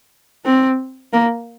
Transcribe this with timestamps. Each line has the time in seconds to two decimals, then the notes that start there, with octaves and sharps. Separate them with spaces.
0.45 C4
1.13 A#3